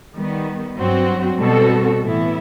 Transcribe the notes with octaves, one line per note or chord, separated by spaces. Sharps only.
D#3 G3 B3
G2 F#3 C4 F#4
B2 G3 C4 F#4 A4
A2 E3 B3 E4